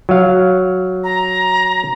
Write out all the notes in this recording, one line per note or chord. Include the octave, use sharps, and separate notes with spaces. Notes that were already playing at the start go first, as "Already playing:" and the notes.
F#3 F5
A#5